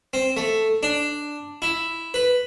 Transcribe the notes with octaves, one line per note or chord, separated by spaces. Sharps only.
C4
A3
D4
E4
B4